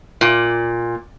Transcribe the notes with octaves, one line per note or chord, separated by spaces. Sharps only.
A#2